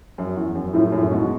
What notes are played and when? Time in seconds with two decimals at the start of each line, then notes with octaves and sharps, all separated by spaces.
0.18 F#2
0.36 E2
0.55 F#2
0.73 F#2 A2
0.92 F#2 A2
1.11 G#2 B2